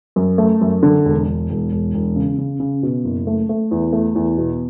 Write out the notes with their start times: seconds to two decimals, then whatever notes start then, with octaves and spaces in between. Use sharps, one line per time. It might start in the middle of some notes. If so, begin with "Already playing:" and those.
0.16 F#2
0.38 A3
0.61 F#2
0.83 D3
1.05 E1
1.27 E1
1.50 E1
1.72 E1
1.94 E1
2.16 C#3
2.38 C#3
2.60 C#3
2.83 B2
3.05 F#1
3.27 A3
3.49 A3
3.71 E2
3.93 A3
4.15 E2
4.38 B2